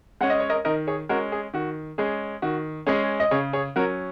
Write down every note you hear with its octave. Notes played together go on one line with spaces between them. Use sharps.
G#3 C#4 F#5
D#5
C#5
A#4 D#5
D#3 A#4 D#5
G#4 C#5
G#3 C#4 F#4 A#4
G#4
D#3 F#4
G#3 C#4 G#4
D#3 F#4
G#3 C#4 G#4
D#5
C#3 G#4 C#5
G#4 C#5
F#3 C#4 F#4 A#4